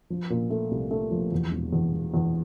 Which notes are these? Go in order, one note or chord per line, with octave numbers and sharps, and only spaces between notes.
F3
A#2
A3
C2
A3
F3
E2
E1
E2
E1
E2